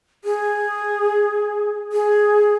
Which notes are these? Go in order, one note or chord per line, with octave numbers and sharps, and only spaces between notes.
G#4
G#4